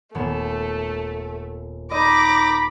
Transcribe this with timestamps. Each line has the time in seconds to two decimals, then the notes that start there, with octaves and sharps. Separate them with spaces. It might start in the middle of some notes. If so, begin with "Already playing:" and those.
0.15 D#1 A3 B3 E7
1.91 D#4 D#5 B5 D6 A#6